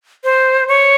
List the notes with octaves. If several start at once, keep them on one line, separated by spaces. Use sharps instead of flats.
C5
C#5